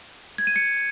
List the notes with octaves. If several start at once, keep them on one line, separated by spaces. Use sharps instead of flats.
G#6
D#7
C#7